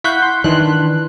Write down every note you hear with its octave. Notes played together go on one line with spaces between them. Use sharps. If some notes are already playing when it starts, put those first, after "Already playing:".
E4 F5 F#5 C#6 G6 B6
C6
D#3 E3 D4 C6 F#6